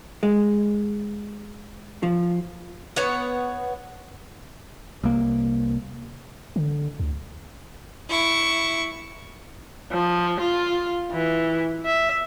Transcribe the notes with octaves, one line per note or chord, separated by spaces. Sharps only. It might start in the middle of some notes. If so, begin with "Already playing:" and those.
G#3
F3
B3 C#5 F#5
C2 A#3
D3
D2
E4 C#6
F3
F4
E3
E5